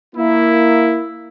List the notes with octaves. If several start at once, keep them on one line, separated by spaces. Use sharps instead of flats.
A#3 E4